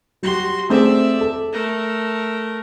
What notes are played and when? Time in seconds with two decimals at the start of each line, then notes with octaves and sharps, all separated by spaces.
0.23 F#3 F#4 G4 C6
0.70 A3 C4 G#4 D5 E5
1.21 A4
1.52 A3 A#4